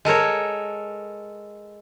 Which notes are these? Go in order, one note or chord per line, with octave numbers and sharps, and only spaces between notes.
G#3 A4 A#4 C#5